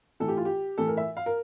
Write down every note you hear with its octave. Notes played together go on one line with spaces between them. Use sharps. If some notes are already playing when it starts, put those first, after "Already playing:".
A2 E3 A4
G4
F4
G4
A2 E3 A4
A#4
E5
F5
A#4